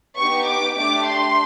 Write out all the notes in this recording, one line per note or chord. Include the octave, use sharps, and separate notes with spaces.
B3 D#4 G4 C#6
D6
A3 D4 G4 D6
C6